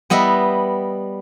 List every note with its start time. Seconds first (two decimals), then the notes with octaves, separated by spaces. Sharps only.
0.10 G3 B3 D#5 E5